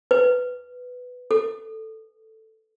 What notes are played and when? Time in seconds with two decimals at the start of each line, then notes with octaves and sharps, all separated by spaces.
0.11 B4
1.31 A4